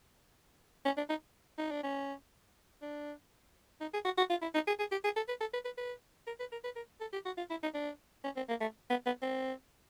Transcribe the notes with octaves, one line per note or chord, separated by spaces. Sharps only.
C#4
D4
D#4
D#4
D4
C#4
D4
D#4
G#4
F#4
F#4
F4
E4
D#4
G#4
G#4
G4
G#4
A4
B4
A4
B4
B4
B4
A#4
B4
A#4
B4
A#4
A4
G4
F#4
F4
E4
D#4
D4
C#4
C4
A#3
A3
B3
B3
C4